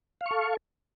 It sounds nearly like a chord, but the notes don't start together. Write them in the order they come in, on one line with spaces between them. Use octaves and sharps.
F5 C#6 A4